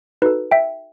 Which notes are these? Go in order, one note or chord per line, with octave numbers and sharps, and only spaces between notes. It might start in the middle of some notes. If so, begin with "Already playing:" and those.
D#4 F#4 A4 B4
E5 G5